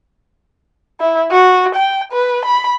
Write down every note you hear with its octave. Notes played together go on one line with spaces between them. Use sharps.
E4
F#4
G5
B4
B5